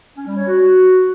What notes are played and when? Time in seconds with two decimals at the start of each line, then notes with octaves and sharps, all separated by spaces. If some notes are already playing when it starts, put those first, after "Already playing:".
0.17 C#4
0.27 G3
0.37 C#5
0.47 F#4